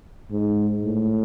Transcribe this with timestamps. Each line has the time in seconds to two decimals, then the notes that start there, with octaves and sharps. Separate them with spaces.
0.31 G#2
0.85 A2